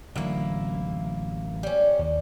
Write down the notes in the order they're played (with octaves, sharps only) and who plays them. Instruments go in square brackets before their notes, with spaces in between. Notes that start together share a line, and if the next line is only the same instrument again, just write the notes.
[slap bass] A1 D3 F#3 [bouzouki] A#3 E4
[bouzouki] G3 C#4
[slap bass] D#2